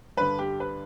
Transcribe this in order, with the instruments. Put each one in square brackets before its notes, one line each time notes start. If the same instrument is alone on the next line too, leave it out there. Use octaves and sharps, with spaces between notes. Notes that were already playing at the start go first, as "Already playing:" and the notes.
[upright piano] G2 D3 G3 B4
G4
B4